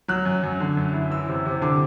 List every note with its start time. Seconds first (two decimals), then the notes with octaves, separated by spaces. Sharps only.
0.08 F#3 F#6
0.25 F#2
0.43 F#2
0.60 D3
0.77 F#2
0.93 E4
1.11 E3 E6
1.29 C3
1.46 C3
1.62 D3 D6